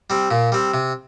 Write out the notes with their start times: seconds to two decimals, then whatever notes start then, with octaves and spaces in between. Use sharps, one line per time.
0.10 G3 C4
0.31 A#2
0.52 G3 C4
0.74 C3